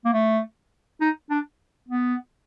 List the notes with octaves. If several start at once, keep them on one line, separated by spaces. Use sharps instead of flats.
A#3
A3
D#4
D4
B3